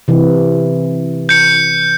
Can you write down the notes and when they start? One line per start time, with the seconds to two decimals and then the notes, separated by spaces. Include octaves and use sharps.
0.08 C3 E3
1.29 G6 C#7